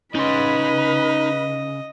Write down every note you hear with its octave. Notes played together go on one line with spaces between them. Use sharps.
C#3 D#4 B4 D#5 B5 C6